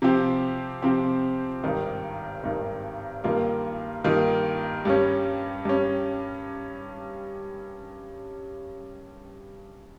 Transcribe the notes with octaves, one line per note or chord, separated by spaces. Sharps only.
C3 F3 C4 G4
C3 F3 C4 G4
G#1 G2 D#3
G#1 G2 D#3
G2 D#3 A#3 F4
G2 D#3 A#3 F4
G2 G3 C#4
G2 G3 C#4